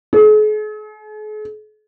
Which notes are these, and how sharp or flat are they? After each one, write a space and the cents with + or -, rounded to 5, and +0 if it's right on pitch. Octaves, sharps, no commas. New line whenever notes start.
G#4 +45